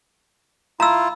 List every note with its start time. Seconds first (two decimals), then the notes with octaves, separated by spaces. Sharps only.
0.80 E4 F4 A#5 E6